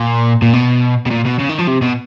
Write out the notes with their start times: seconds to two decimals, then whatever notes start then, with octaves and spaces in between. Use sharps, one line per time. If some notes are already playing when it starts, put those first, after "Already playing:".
Already playing: A#2
0.42 A#2
0.53 B2
1.06 B2
1.10 A#2
1.25 B2
1.39 C#3
1.49 D#3
1.59 F3
1.67 C3
1.82 B2